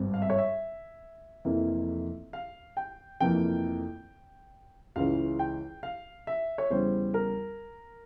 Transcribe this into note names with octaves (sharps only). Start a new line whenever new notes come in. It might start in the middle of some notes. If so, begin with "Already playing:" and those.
Already playing: G#1 G2 G3 C4
F5
E5
C#5
E5
F1 F2 E3 A#3 E4
F5
G5
F1 F2 E3 A#3 G5
C#2 C#3 E3 F5
G5
F5
E5
C#5
E2 C#3 G3 C5
A#4